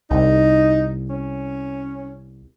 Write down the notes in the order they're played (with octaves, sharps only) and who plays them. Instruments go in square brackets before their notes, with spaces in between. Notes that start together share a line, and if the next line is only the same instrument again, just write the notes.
[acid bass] C2 [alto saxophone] D#4
[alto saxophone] C#4